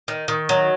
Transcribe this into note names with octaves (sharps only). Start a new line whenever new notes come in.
D#3
D#3
F#3